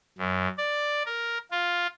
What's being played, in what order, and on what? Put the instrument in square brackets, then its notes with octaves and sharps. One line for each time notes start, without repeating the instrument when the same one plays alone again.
[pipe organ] F#2
D5
A#4
F4